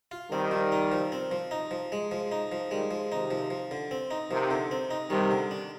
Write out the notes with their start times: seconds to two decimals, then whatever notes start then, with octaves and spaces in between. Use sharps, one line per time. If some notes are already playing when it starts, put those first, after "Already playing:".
0.11 F4
0.31 D#3 G3 C4
0.51 F3
0.72 D#4
0.92 F3
1.12 C4
1.31 F3
1.51 D#4
1.71 F3
1.92 G#3
2.12 F3
2.32 D#4
2.52 F3
2.71 D#3 G3 G#3
2.91 F3
3.12 C3 D#3 D#4
3.31 F3
3.50 F3
3.71 D3
3.91 C4
4.11 D#4
4.31 C3 D#3 F3
4.51 D3
4.71 C4
4.91 D#4
5.10 C3 D#3 G3
5.31 D3
5.51 D4